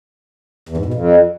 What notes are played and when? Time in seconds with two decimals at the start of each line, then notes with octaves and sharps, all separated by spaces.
0.69 E2
0.77 G#2
0.85 B2
0.94 F2